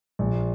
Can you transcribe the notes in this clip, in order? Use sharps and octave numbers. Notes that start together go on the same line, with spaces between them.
A#1